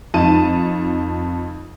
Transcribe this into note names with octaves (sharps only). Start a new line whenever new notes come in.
F2 D#4 A5 D#7